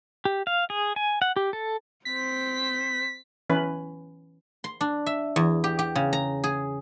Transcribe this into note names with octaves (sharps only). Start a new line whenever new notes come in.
G4
F5
G#4
G#5
F#5
G4
A4
C4 C5 B6
E3 C#4 B4
C6
D4
E5
E2
G4
G4
C#3
A#5
G#4